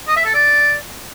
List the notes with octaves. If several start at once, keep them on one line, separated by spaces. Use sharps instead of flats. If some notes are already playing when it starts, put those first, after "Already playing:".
D#5
E5
A4
D5